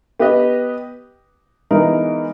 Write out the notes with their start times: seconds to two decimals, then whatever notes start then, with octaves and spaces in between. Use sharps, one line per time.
0.20 B3 G4 B4 D#5
1.71 E3 G#3 B3 D#4 A#4